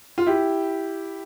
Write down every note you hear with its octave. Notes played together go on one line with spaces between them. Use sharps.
F4
E4 G4